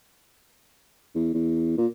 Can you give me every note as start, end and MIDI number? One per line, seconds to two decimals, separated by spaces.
1.15 1.30 40
1.34 1.76 40
1.78 1.87 46